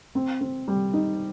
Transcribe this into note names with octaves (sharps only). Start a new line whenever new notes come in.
C4
C4
G3
D#4